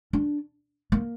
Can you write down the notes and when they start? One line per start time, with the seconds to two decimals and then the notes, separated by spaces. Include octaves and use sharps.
0.13 D4
0.92 A#3